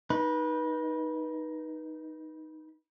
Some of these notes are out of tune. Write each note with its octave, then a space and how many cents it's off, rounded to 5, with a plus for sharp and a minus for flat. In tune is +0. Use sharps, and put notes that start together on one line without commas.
D#4 +0 B4 -25